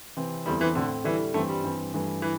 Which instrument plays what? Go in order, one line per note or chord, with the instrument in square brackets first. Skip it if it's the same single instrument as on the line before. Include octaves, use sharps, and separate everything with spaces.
[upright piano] C3 E3 C4
[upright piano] E2 D3 C4 E4 [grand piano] G3
[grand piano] E3
[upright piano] A2 A3 C4 [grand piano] D3
[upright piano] D3 G3 E4 [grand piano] E3
[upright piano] G2 E3 C4 [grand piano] A3
[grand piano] G3
[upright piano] G2 E3 C4
G2 E3 A3
[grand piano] E3